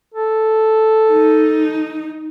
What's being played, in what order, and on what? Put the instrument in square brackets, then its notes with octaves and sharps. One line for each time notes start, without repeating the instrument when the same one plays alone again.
[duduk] A4
[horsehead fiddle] D#4